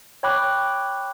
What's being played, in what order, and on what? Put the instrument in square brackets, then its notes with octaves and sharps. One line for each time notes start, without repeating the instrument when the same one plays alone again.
[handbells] C#5 G5 B5 D6 F#6